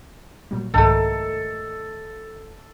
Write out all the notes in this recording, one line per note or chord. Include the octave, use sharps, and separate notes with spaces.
A#2 F#3 G3
C2 G#2 D#3 A3 A4